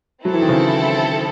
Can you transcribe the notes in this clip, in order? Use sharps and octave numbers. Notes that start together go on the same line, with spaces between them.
F#3 C4 E4 A4
E3
D#3
C#3 E3